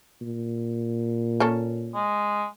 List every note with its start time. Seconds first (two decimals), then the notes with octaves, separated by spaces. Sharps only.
0.21 A#2
1.40 A#3 C#4 A4
1.95 G#3